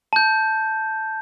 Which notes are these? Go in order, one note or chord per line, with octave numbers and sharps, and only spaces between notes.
A5 G6